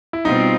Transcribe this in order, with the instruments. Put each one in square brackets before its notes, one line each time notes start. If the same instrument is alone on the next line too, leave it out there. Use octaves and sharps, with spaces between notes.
[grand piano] E4
[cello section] B2 G3 C4 F4 [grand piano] D#4